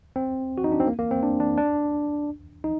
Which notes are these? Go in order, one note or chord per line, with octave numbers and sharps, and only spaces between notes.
C4
F#4
D#4
D4
C4
A#3
A#3
C4
D4
D4
D4
D#4